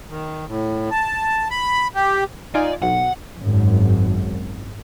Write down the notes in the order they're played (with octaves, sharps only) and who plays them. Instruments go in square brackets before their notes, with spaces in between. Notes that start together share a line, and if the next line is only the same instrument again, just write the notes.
[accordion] D#3
A2
A5
B5
G4
[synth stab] D#4 F4 G#5 [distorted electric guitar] D5
[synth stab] B1 [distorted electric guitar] F#5
[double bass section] G#1 F#2